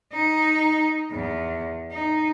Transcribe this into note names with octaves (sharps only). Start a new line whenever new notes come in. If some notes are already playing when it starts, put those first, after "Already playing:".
D#4
E2
D#4